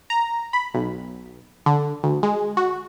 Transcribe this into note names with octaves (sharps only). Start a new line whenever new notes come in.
A#5
B5
B1
D3
D2
G#3
F#4